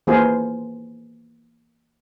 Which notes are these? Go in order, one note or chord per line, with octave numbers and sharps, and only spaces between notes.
E3 A#3 F4 G#4 C5